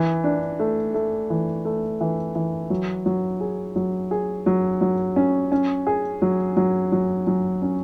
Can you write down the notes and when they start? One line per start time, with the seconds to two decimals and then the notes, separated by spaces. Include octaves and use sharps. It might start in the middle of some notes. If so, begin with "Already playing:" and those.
Already playing: E3
0.24 D4
0.59 A3
0.94 A3
1.30 E3
1.65 A3
2.01 E3
2.35 E3
2.70 F#3
3.06 F#3
3.40 G#4
3.76 F#3
4.11 G#4
4.46 F#3
4.81 F#3
5.16 C#4
5.52 C#4
5.87 G#4
6.22 F#3
6.57 F#3
6.92 F#3
7.27 F#3
7.62 C#4